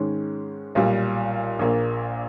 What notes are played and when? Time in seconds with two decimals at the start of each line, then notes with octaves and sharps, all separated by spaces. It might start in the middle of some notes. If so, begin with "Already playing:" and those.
Already playing: G#2 D#3 G#3 C#4
0.75 B1 A#2 G3
1.59 A#1 A#2 A#3